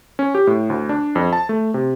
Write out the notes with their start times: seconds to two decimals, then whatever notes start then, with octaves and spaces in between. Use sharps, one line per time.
0.19 C#4
0.35 G4
0.47 A2
0.70 D2
0.89 D4
1.15 F2
1.33 A5
1.49 A3
1.74 C3